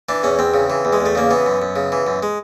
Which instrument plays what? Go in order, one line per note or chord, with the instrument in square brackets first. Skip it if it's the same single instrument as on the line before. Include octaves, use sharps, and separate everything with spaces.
[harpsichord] E3 D4
E2 C#4
E2 C4
C#3
E3
E2
G#3
E2 A3
C#3 A#3
E3 B3
F#2
F#2
C#3
E3
F#2
G#3